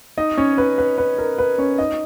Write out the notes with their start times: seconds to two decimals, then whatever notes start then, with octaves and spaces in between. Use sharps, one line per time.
0.18 D#4 D#5
0.37 C#4 C#5
0.58 B4
0.78 B4
0.98 B4
1.18 A#4
1.38 B4
1.58 C#4 C#5
1.78 D#4 D#5